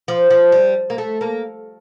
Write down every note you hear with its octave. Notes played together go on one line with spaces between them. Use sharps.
F3
F3
G3
A#3
A3
A#3